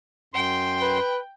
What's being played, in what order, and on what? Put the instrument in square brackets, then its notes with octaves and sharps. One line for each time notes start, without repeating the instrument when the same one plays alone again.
[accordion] F#2 C6 [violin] G5
[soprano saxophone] B4